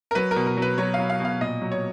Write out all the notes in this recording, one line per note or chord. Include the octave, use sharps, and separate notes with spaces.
A#4
F#3 B4
A#4
B2
A#4
F#3 B4
F#3 C#5
F#3 F5
F5
B2 F5
A#2 D#5
F#3
C#5